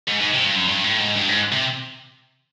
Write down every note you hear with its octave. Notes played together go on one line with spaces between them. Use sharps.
G#2
G#2
C3
G2
F#2
G2
A2
G#2
G2
G#2
C3